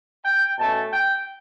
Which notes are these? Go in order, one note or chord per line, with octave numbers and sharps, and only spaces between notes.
G5
B2 A3 C#4 A5
G5